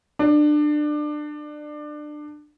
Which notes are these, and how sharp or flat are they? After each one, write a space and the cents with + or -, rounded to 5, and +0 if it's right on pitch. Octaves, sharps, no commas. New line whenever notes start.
D4 +25